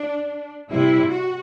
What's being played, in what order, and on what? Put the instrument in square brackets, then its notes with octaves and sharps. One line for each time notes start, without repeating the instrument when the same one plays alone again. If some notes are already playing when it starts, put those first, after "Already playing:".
Already playing: [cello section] D4
C3 G3 E4
F#4